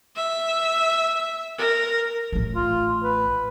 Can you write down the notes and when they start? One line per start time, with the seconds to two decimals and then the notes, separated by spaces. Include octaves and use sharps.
0.16 E5
1.58 A#4
2.32 A1 A3
2.56 F4
3.03 B4